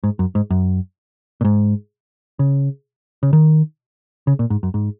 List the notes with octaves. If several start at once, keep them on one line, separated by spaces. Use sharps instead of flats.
G#2
F#2
G#2
F#2
A#2
G#2
C#3
C#3
D#3
C#3
A#2
G#2
F#2
G#2